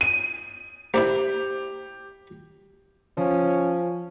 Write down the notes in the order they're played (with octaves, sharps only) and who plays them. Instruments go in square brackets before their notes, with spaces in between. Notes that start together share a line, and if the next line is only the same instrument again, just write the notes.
[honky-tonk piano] D#7
[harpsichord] A#3 D4 E4 [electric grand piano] G4 [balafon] C5
[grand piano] F3 [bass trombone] C#4